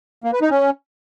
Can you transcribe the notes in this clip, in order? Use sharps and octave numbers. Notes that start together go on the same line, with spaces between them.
A#3
B4
D#4
C#4